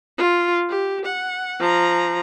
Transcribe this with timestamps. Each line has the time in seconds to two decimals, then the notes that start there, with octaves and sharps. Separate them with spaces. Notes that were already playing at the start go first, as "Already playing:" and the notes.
0.18 F4
0.69 G4
1.05 F#5
1.60 F3 A#5